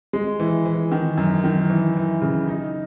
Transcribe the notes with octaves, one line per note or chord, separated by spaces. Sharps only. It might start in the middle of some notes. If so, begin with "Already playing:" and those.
G#3
E3
E3
D#3
F#2
D#3
E3
E3
C#3
D#4